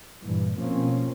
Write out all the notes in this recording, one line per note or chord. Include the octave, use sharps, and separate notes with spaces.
G2 A#2 E3
B2 F3 A#3 C4 C#4